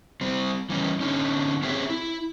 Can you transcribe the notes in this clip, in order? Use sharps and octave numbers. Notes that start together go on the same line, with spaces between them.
G3 C4
E3 G3 C#4
D3 C#4 D#4
C4 C#4 G4 G#4 C#5 E5
E4